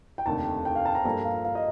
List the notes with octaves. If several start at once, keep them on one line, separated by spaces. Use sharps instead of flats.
G5
F1 D#2 D3 A3 D#4 A5
G5
F5
A5
A#5
G2 F3 A#3 F4 A4 A#5
F5
F5
D#5